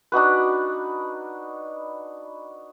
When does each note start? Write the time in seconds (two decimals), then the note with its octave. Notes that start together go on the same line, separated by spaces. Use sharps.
0.12 D4 D#4 F#4 B4